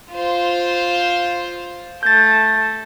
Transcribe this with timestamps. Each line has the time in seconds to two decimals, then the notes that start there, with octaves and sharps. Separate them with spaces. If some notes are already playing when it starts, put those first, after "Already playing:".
0.12 F4 C5
2.03 A3 G6 A6